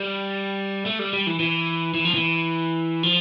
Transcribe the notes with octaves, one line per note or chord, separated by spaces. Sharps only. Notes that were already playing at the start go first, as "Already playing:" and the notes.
Already playing: G3
A3
G3
G3
E3
E3
E3
F3
E3
F3